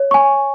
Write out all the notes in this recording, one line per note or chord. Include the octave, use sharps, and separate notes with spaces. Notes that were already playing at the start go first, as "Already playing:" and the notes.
Already playing: C#5
G#5 C#6